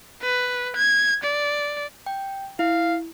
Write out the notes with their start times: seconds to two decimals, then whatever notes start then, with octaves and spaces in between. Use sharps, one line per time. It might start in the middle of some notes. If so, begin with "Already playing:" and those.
0.22 B4
0.76 G#6
1.23 D5
2.06 G5
2.59 E4 F5